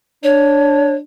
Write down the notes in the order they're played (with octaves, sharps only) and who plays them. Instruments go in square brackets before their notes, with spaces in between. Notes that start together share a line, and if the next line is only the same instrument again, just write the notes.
[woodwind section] D4 [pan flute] C#5